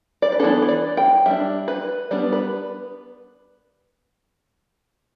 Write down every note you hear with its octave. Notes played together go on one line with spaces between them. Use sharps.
D5
B4
E3 B3 D4 A4
B4
D5
G5
G3 D4 E5
B4
G3 B3 D4 D5
B4